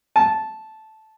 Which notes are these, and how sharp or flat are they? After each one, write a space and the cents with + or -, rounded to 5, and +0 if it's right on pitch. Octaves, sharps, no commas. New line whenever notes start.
A5 -10